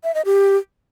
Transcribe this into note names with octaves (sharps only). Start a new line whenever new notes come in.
E5
D#5
G4